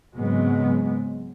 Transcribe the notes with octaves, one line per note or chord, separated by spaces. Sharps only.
G#2 C#3 F#3 G#3 B3 C4